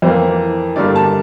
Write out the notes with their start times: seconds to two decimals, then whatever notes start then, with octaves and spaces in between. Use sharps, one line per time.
0.02 F2 E3 A#3 C5
0.76 G2 D3 G3 A#3 D5
0.96 A5